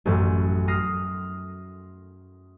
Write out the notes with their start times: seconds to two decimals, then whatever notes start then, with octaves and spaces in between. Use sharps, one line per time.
0.05 A1 F#2 A2
0.68 D#6 F6 A#6 C7